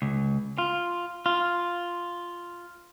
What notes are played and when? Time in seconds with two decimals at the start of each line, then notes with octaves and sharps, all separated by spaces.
0.02 C#2
0.58 F4
1.26 F4